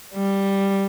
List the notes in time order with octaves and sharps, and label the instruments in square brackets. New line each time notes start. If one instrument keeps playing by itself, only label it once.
[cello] G3